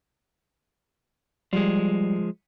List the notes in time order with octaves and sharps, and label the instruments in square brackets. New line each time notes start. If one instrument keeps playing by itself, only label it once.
[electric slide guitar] F3 G#3 [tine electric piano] G3